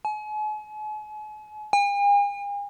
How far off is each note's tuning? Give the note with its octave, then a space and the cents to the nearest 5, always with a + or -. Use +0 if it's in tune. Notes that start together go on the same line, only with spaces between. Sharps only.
G#5 +40
G#5 -45